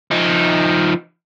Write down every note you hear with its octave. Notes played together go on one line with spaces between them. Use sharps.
F3 D#4